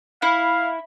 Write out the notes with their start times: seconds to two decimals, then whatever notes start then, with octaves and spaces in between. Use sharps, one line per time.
0.22 E4 F5